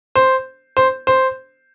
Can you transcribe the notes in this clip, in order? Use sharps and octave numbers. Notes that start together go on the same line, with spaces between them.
C5
C5
C5